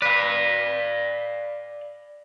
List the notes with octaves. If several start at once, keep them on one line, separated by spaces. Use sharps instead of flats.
B4 D5 F5